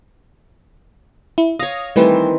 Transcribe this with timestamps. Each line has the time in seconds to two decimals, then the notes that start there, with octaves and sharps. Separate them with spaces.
1.38 E4
1.59 C#5 F5 D#6 A#6
1.96 D#3 E3 G3 A3 C4 B4